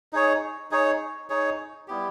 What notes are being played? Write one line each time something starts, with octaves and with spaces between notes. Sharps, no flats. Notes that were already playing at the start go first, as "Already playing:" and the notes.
D#4 G#4 C#5
D#4 G#4 C#5
D#4 G#4 C#5
G3 B3 E4 G4